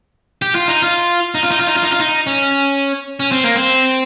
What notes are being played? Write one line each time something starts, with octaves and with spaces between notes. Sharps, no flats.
G4
F4
D#4
F4
D#4
F4
D#4
F4
D#4
F4
D#4
F4
D#4
C#4
C#4
C4
A#3
C4